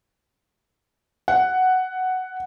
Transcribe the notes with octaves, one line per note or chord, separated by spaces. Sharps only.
F#5